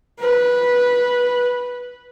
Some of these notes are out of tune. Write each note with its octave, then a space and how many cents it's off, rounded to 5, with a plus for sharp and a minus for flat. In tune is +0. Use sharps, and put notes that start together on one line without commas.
B4 -10